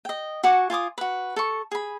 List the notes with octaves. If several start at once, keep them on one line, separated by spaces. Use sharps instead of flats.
D#5 G5
F#4 F#5 G#5 D6
F4 G#5 D6 D#6
F#4 B4
A4 C#6
G#4 B5